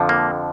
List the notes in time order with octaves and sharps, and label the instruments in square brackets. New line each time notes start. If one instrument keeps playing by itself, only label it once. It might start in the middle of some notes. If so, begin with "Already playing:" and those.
Already playing: [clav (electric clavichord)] F2 D3 F3
A#3